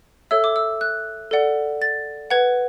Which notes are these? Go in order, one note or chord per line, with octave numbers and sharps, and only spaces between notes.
A4 C#5 E5 E6
D6
E6
F#6
A4 D5 F#5
A6
B4 F#5 G#6